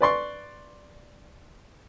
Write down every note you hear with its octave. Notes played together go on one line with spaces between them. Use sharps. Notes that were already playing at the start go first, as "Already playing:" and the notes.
B4 D5 C6 C#6